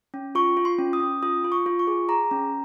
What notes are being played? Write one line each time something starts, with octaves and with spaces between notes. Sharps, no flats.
C#4
F4 C#6
F4
C6
C#4
D#6
C#4
F4 D#6
F4
C#6
F4
C#6
G#4
G#4 A#5
C#4